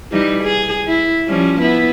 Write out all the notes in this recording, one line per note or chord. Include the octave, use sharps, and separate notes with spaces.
E3 G3 D#4
G#4
E4
F3 G3 C#4
B3 E4